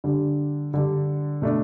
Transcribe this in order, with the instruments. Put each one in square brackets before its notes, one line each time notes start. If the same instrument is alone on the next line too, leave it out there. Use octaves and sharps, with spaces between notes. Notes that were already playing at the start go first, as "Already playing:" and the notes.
[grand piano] D3 G3 D4
D3 G3 D4
B2 A3 D4